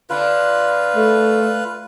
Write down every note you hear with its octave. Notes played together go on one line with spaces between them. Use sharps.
D3 D4 F4 B4
A3